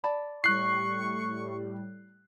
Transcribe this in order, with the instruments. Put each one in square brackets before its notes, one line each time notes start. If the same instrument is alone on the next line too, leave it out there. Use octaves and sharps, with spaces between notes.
[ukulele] D5 A5 B5
[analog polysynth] A2 G3 [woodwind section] C#6 [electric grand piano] F#6 C7